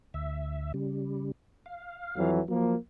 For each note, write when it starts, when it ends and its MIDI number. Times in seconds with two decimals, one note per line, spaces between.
0.14 0.72 38
0.14 0.72 76
0.74 1.32 49
0.74 1.32 55
1.66 2.31 77
2.16 2.39 41
2.16 2.39 52
2.16 2.39 54
2.48 2.75 53
2.48 2.76 54
2.48 2.75 58